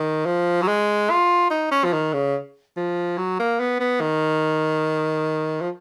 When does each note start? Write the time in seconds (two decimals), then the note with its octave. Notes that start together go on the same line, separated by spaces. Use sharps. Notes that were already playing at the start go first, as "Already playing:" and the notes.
Already playing: D#3
0.26 F3
0.62 F#3
0.68 G#3
1.10 F4
1.50 D#4
1.71 C#4
1.84 F3
1.93 D#3
2.13 C#3
2.77 F3
3.18 F#3
3.39 A#3
3.60 B3
3.80 B3
4.01 D#3
5.61 F3